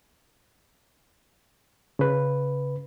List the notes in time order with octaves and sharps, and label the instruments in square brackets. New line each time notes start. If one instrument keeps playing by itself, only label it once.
[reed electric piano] C#3 B4